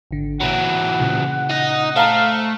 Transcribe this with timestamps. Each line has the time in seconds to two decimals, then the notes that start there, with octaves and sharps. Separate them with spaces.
0.11 G#1 D3
0.41 A#2 E3 F#3 F#5 B5
1.00 A#2 C#3
1.50 D#4 D#5
1.96 A3 C5 F5 A5 A#5